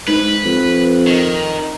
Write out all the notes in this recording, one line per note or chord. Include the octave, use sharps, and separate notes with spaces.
G#2 B4
F2
D#3